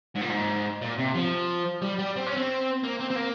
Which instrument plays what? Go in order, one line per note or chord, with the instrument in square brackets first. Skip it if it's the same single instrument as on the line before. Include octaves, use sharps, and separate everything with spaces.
[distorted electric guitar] G#2
A#2
G#2
A#2
C3
F3
G3
G3
C4
C#4
C4
A#3
C4
C4
A#3